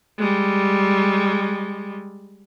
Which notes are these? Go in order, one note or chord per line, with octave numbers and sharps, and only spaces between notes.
G3 G#3